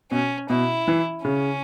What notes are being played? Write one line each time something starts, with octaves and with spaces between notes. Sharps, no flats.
B2 C#4
B2 E4
E3
C#3 C#4